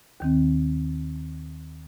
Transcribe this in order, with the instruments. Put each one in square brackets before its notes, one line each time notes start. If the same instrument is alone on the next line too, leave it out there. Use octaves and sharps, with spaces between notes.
[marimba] D#2 D#3 C4